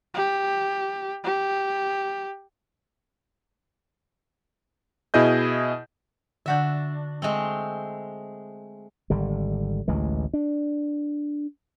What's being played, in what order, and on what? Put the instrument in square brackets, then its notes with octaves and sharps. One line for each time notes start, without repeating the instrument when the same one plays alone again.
[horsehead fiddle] G4
G4
[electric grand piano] B2 E4 G#4 D#5 G6
[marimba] D3 F#5 G6 [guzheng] D4 F#4 E5
[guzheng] G#3 A3 C4
[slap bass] G#1 D3 G3
A1 D2 E3 G#3
D4